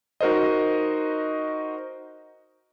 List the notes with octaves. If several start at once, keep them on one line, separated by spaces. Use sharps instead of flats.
D#4 F#4 A#4 C5 D#5